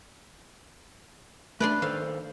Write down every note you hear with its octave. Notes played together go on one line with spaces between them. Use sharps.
A3 D4 B4 D5 C6
D#3 A4 C5 F5